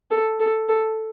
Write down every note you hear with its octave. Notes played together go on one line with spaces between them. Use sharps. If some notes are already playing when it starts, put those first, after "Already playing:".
A4
A4
A4